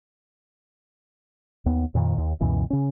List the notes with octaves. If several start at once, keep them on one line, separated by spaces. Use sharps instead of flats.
D#2 B3
F2 A#2 D#3
D#2
C#2 F#2 B2 E3
C#3 C#4